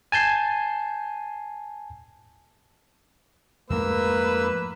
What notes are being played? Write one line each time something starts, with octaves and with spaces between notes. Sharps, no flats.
G#5 A5 G6 C7
F2 G#2 A3 A#3 B4 E6